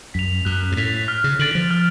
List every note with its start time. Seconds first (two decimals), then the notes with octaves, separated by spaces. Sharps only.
0.14 F#2 B6 F7
0.45 F#2 F#6
0.72 G#2
0.77 A2 B6 F7
1.08 F6
1.24 C#3
1.39 D3 A6 D7 F#7
1.55 F3
1.71 F6